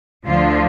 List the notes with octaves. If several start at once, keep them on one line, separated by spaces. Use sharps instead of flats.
D2 D3 F3 F4